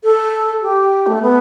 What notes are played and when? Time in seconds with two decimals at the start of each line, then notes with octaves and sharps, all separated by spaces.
0.04 A4
0.62 G4
1.07 A3
1.22 B3